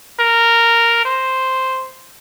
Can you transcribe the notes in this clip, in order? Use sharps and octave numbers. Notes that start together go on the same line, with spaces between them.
A#4
C5